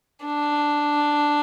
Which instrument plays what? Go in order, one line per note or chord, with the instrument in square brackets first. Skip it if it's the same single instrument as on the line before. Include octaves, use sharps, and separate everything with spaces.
[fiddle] D4